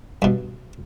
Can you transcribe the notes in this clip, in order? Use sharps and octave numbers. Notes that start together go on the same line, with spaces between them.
G2 B2